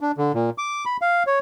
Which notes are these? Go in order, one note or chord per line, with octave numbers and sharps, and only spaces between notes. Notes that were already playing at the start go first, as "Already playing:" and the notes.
D4
D3
A#2
D6
B5
F5
C#5